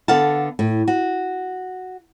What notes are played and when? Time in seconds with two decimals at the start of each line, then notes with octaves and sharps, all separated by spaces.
0.08 D3 B3 A4 F5 F#5 A5
0.59 A2
0.88 F#4